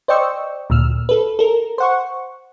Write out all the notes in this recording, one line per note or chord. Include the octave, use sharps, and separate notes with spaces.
C5 D5 D#5 G5 C#6 E6
D2 A#2 E6 F6
A4 B4
A4 A#4
C5 F#5 C#6